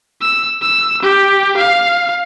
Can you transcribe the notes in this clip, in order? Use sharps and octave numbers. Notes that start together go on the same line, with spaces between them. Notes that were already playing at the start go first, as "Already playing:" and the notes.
E6
E6
G4
F5